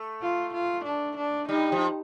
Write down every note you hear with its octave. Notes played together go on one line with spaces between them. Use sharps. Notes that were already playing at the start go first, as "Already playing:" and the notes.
Already playing: A3
F4
F4
D4
D4
G3 D#4
F3